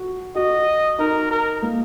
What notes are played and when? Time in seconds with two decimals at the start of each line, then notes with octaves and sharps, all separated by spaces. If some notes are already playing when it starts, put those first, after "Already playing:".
Already playing: F#4
0.35 F#4 D#5
0.99 D#4 A#4
1.31 A#4
1.62 A#3